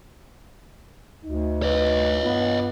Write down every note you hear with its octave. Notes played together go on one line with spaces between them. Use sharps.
D2 D#4
B4 C#5 D#5
G2 B3 F4